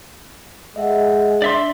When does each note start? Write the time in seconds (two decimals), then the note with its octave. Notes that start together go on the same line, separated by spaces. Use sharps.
0.76 G#3 D#5 E5 F#5
1.42 D4 D5 E5 C6